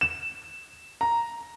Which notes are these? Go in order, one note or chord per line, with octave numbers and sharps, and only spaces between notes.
E7
A#5